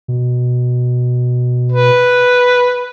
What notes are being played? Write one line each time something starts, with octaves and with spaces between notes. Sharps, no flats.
B2
B4